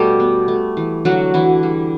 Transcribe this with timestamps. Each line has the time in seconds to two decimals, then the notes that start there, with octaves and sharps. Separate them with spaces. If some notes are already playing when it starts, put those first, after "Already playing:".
Already playing: B2 G3 A3 G4 A4
0.20 B3
0.48 A3
0.77 E3
1.05 D3 F#3 F#4
1.34 D3 E3 E4
1.63 G3